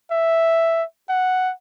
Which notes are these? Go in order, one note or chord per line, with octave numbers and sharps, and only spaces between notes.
E5
F#5